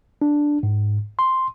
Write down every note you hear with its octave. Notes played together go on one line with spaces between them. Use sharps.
D4
G#2
C6